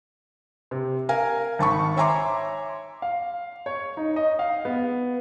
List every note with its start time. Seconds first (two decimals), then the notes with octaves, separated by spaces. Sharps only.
0.71 C3
1.09 A#4 F5 G#5
1.59 G#1 A5 B5 C#6
1.97 C#5 E5 G#5 A#5 C6 D6
3.02 F5
3.66 C#5
3.97 D#4
4.16 D#5
4.39 F5
4.65 B3